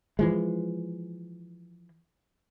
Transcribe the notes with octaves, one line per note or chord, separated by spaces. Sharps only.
E3 F3 G#3